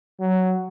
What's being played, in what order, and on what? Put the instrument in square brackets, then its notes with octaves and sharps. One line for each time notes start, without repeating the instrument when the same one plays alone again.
[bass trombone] F#3